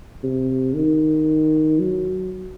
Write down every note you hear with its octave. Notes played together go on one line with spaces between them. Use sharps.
C3
D#3
F#3